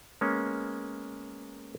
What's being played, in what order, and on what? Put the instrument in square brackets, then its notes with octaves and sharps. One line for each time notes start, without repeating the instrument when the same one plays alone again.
[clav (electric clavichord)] G#3 A#3 B3 C#4